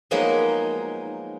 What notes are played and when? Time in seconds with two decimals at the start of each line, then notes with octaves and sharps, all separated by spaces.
0.11 F3 F#3 G#3 A#3 B3 D#4